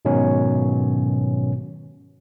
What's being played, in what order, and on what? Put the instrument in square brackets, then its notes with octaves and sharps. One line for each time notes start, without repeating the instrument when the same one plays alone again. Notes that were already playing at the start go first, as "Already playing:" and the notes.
[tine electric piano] G#2 B2 D#3 F#3 C#4